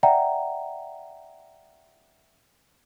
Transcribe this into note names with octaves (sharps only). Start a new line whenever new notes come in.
D5 E5 F#5 G5 A#5